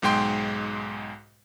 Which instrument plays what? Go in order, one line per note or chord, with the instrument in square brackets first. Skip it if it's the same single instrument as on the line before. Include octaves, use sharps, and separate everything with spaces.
[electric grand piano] B1 G#2 G#3 G5 C6